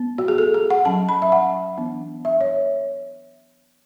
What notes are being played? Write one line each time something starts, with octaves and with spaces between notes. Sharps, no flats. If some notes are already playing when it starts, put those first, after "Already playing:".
Already playing: B3
F#4
G#4
A4
G#4
F#5
F#3 C#4 A5
B5
E5
F#5
E3 B3 D4
E5
C#5